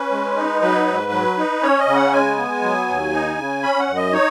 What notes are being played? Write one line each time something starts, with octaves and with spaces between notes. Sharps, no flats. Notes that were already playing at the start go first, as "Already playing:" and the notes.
Already playing: C#4 B4
G#3
D#4
F#3 B4
G#2
F#3
D#4
C#4 C#5
D#5
C#3
F#5
G#3 G#5
B3
F#3
D#2
D#4
C#3
C#4 B5
F#5
F#2
D#5
D#4 C#5